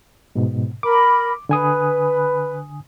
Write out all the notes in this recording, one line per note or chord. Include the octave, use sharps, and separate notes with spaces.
G#2 B2
A#4 B5 D6
D3 B4 G#5 D#6